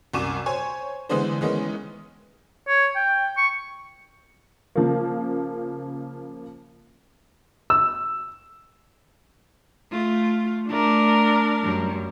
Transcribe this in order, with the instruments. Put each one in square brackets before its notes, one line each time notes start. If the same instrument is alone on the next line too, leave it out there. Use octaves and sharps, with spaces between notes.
[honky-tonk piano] C2 F#2 C#6 D6 D#7 E7
C5 C#5 G#5 C#6
D3 E3 G#3 B3 D4 C5
D#3 E3 G#3 B3 C#4
[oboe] C#5
G5
C#6
[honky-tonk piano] C#3 F3 A#3
[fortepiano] E6
[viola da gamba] A3 F4
[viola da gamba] A3 [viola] D4 A#4
[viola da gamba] F#2 G3